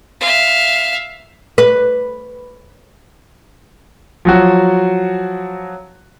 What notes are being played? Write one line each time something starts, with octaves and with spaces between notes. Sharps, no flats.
E5 F5
B4
F3 F#3 F#4